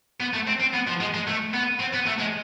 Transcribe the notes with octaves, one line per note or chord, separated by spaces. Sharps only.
B3
A3
C4
C4
B3
F3
G#3
G#3
A3
B3
C4
B3
A3
G#3